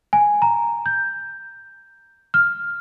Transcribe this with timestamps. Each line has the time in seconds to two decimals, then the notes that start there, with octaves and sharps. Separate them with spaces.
0.13 G#5
0.42 A#5
0.86 G6
2.34 F6